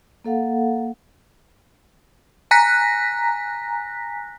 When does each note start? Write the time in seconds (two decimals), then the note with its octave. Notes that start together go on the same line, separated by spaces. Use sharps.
0.25 A#3 A4 F5 F#5
2.51 G#5 A#5 F#6 A#6 B6